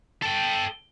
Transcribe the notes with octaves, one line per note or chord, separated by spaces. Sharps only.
A4 G5